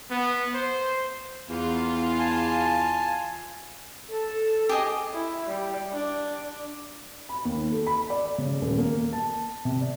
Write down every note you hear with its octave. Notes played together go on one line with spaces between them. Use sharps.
B3
C5
E2 F4
G#5 A5
A4
G4 G#4 D#5
E4
G3
D4
B5
D#2
A4
B5
D5
C#3
D#1
A#3
A5
C3
D5